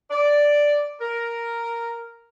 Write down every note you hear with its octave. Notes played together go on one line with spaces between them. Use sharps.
D5
A#4